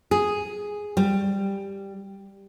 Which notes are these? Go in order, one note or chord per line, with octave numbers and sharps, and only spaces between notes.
G#4
G3